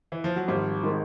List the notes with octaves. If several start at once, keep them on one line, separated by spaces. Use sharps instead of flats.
E3
F3
F#3
G#1 F3 G3
D#3 G#3